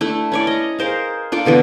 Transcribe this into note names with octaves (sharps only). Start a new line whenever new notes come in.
A3 D4 E4
C#4 C#5 D5
D#5 A#5
G#4 A#4 C5 F5
D4 F4 A4 D5
B2 D3 E3 B3